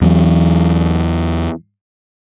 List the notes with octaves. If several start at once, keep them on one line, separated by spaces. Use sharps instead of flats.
E2 E3 F#3